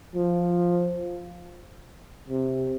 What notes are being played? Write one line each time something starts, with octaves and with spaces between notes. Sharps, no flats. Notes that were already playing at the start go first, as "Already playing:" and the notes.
F3
C3